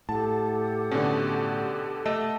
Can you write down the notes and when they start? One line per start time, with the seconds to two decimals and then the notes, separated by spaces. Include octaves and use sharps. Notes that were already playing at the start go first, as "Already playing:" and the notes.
0.09 A2 G4 A4 F#5 A5
0.91 B2 D3 C#4
2.05 A3 D#5 A5